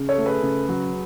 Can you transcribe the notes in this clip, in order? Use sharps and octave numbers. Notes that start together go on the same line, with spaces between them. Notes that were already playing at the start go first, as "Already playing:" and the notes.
Already playing: C#3
A4 C#5
A3
G#4 B4
C#3
F#3